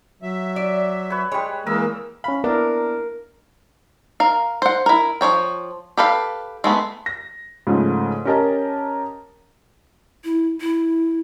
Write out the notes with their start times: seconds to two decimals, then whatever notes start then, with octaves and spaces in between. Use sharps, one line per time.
0.22 F#3 E5
0.56 D5
1.10 B4 C#5
1.32 G3 G#3 C#5
1.66 E3 G#3 A#3 A#4 D#6 E6
2.24 C#4 F5 B5
2.44 B3 D4 E4 A#4
4.20 A#4 F5
4.62 C5 F#5
4.86 E4 A#4
5.21 F3 E4 C#5 G5
5.97 G4 A4 B4 F5
6.64 G#3 A3 B3
7.06 A#6
7.67 G#2 C#3 F3 A3
8.25 C#4 G4 A#4 D#5 A5 A#5
10.24 E4
10.61 E4